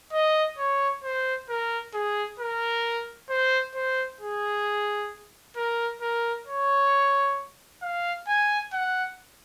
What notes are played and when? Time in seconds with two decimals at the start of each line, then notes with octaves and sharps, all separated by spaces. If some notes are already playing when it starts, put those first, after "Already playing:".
0.13 D#5
0.58 C#5
1.04 C5
1.49 A#4
1.94 G#4
2.40 A#4
3.30 C5
3.75 C5
4.21 G#4
5.57 A#4
6.01 A#4
6.47 C#5
7.82 F5
8.28 G#5
8.73 F#5